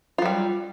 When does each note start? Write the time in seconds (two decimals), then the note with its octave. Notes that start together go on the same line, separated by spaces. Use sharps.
0.18 F4
0.22 F#3
0.25 G3